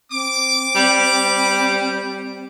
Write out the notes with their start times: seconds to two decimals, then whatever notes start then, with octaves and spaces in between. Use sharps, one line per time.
0.11 C4 D6
0.76 G3